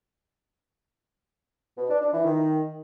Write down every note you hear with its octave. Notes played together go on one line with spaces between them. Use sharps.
B2
D4
D4
E3
D#3